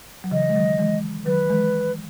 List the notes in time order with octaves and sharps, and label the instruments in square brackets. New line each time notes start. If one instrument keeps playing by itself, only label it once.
[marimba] F#3
[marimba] C#3 E3 [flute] D#5
[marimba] G#3
D#3 F#3
E3 G#3
[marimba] D#3 F#3 [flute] B4
[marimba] E3 G#3